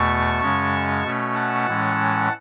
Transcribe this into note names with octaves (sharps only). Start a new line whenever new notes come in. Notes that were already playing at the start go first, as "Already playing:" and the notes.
Already playing: E2 B2 A3 A5 C#6
F#2 C#3 G#3 C#4
B2 A3 C#4
F#5 A5
A2 E3 G#3 C#4